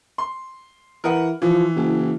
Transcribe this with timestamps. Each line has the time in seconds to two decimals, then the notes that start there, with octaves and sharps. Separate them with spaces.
0.18 C6
1.04 E3 A#4 B4 F#5
1.42 E3 F3
1.76 F#1